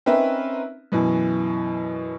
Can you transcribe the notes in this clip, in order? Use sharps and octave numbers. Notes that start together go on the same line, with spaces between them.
C4 C#4 D#4 A#4 B4 E5
F#2 B2 E3